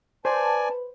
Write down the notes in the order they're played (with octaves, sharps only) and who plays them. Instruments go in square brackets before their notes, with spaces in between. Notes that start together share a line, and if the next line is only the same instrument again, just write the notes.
[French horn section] B4 [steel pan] C5 [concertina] D5 G#5 [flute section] A5